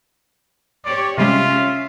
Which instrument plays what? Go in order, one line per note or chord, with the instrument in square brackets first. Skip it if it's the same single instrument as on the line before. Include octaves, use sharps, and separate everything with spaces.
[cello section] G4 C#5 [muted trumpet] D5
[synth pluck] C3 G3 G#3 [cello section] C#4 E5 [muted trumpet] F4